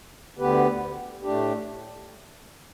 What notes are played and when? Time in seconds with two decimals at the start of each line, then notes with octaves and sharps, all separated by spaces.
0.37 D2 D3 B3 G4 B4
1.22 A2 A3 D4 G4